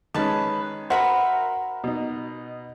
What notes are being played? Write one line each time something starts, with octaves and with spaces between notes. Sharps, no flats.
D#3 G#3 C#4 B4 A5
F#4 A#4 C5 E5 B5
B2 D#4